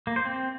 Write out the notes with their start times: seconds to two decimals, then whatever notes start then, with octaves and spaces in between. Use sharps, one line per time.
0.07 A#3
0.16 C5
0.25 C4